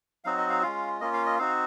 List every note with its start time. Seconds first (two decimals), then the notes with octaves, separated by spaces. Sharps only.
0.24 F#3 C4 D#4 F#4 F5
0.38 D#5
0.50 F5
0.63 G#3 C#4 F4 F5
1.01 A#3 C#4 F4 D#5
1.14 F5
1.26 D#5
1.38 C4 D#4 F#4 F5